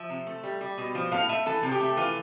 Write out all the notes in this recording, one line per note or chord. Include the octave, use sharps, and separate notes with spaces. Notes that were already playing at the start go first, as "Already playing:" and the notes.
Already playing: F3 E5
C3
A3
G3
G3
B2
F3
A2 F5
A3 E5
E3 A4
C3
G4
A3
E3 F4